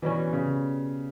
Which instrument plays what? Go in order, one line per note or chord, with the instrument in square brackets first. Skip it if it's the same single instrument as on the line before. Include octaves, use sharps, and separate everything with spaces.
[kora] B2 G3 C#4 [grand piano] E3
[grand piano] C#3